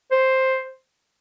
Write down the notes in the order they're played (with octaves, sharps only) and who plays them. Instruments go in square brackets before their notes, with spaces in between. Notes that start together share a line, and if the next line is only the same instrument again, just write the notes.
[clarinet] C5